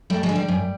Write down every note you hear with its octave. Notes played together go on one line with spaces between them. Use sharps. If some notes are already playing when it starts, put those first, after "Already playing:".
F#2 G3 A3
F#3 G#3
D3
G3
F#2